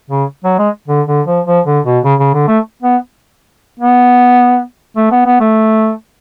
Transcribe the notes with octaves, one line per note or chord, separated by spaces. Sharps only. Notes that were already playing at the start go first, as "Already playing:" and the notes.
C#3
F#3
G#3
D3
D3
F3
F3
D3
B2
C#3
C#3
D3
A3
B3
B3
A3
B3
B3
A3